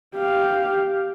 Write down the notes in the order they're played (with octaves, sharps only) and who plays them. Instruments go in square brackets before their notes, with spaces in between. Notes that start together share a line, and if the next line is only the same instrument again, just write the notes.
[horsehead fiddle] G4 F5